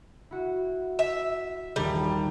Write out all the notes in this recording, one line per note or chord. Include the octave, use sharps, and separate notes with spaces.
E4 F#4
E5
A#1 D#2 G3